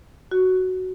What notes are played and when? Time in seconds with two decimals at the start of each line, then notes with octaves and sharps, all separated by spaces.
0.31 F#4